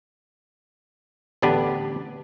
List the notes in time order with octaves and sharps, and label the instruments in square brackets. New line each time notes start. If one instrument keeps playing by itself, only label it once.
[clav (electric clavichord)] A1 D2 B3 D4 G4 B4